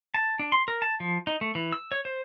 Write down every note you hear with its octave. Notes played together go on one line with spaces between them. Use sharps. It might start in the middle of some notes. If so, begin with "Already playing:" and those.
A5
D4
C6
A#4
A5
F3
D#4
A3
E3
E6
C#5
C5